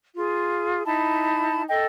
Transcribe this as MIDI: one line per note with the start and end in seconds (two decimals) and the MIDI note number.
0.15 0.84 65
0.15 0.84 68
0.86 1.62 63
0.86 1.62 64
0.86 1.62 81
0.86 1.62 83
1.69 1.86 69
1.69 1.86 75
1.69 1.86 79